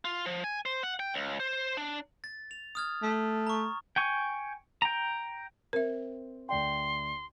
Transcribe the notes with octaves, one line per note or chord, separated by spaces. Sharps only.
F4
F3
G#5
C5
F#5
G5
C#2
C5
D4
A6
F7
D#6 F6 G#6
A3
A#5 C#6
G5 G#5 C#6
G5 A#5
C4 A#4 E5
D2 D5 G5 C6